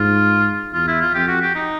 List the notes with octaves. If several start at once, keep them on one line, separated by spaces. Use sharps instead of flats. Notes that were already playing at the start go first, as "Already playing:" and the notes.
Already playing: G#2 F4
E2 F4
E4
F4
F2 G4
F#4
G4
D#4